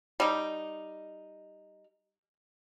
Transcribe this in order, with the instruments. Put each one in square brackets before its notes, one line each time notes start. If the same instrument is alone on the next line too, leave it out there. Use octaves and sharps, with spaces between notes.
[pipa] G3 D#4